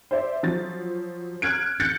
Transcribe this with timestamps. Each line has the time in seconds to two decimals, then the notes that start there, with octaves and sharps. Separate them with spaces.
0.11 C5 D5 E5
0.43 F3 F#3 A6
1.42 F6 F#6 G#6 D7
1.80 F#6 G6 A6 C#7